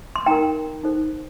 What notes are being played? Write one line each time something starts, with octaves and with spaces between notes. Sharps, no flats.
C6
D#4 A#4 G5 A#5
D#4 A4 C5